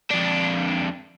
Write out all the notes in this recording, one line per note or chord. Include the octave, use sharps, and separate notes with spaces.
F2 D4